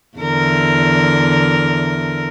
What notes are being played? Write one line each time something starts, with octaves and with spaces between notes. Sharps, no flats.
E2 D3 A#4